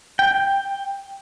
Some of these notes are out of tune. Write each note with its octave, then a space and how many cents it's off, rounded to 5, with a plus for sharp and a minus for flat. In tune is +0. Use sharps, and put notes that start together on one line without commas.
G5 +5